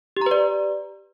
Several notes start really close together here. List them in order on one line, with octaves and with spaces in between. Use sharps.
G4 A#5 B4 D5